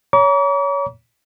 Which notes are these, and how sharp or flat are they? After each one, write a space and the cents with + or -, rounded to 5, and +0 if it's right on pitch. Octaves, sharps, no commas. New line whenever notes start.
C#5 +20 A#5 +30 D6 -45